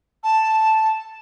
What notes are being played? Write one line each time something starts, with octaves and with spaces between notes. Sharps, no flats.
A5